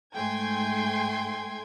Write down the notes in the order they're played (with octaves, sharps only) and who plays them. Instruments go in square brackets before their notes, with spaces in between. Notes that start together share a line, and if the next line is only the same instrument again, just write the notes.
[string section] G#2 A3 G5 G#5 C6 G#6